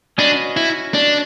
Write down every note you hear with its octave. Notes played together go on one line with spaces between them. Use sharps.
C#4 D4 F#4 B4 D#5
E4
D4